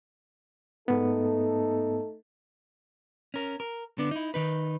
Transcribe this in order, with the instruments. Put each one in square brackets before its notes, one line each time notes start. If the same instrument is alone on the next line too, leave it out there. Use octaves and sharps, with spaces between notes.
[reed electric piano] G#2 B3 [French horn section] A3 D#4 A4
[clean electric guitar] C#4 A#4
A#4
D3 B3 D4
D#4 E4
D#3 D#4 B4